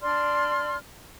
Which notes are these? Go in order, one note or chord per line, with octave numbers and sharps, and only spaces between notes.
D4 D5 C6 F6